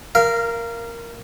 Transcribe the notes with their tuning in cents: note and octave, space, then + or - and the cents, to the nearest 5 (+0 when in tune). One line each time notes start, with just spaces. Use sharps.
A#4 +0 F5 -25